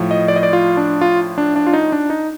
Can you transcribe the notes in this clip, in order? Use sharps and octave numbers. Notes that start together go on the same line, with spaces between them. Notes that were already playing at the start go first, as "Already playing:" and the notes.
Already playing: A2 F3
D#5
D5
D#5
D5
F4
D4
F4
D4
D4
F4
D#4
D4
D#4